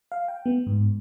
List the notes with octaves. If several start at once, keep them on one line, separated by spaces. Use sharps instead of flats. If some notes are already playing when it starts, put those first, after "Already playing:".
F5
G5
B3
G#2